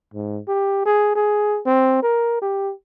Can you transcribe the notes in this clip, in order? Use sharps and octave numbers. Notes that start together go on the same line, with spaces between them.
G#2
G4
G#4
G#4
C4
A#4
G4